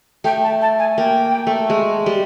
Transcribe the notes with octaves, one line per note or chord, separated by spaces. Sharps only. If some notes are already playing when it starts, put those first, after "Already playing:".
A3 G5
A5
A5
G#5
A#3 G5
A3
G#3
G3